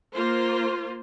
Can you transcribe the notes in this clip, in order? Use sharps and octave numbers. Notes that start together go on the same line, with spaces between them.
A#3 F4 C5